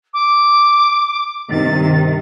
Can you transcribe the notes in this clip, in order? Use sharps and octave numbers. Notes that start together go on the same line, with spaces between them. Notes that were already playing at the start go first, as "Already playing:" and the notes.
D6
G2 C3 D#3 A6